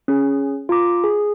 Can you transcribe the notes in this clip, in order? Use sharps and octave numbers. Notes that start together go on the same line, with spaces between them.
C#4 G#4
F4 A#5 D6
G#4